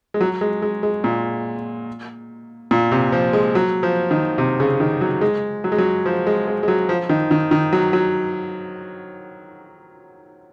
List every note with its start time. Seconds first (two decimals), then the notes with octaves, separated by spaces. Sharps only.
0.14 G#3
0.21 F#3
0.41 G#3
0.62 G#3
0.83 G#3
1.04 A#2
2.71 A#2
2.92 C3
3.12 F3
3.33 G#3
3.55 F#3
3.83 F3
4.11 D#3
4.38 C3
4.60 C#3
4.80 D#3
5.01 F#3
5.21 G#3
5.64 F#3
5.72 G#3
5.78 F#3
6.06 F3
6.27 G#3
6.47 G#3
6.63 G#3
6.68 F#3
6.89 F3
7.09 D#3
7.31 D#3
7.51 D#3
7.73 F#3
7.93 F#3